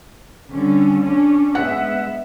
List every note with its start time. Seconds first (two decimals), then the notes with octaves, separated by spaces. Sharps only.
0.51 D3 G3 C#4
1.02 C#4 D4
1.55 G#3 B3 E5 F#5